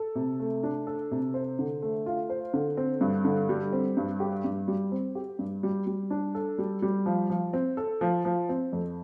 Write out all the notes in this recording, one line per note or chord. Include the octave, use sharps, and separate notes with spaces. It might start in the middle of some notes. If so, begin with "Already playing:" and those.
Already playing: A4
C3
A3
D4
A4
C3
C5
D3
A3
F4
C5
D3
C4
G2
D3
G3
C4
G2
G4
G2
G3
C4
G4
G2
G3
G3
D4
A4
G3
G3
F3
F3
C4
A4
F3
F3
C4
F2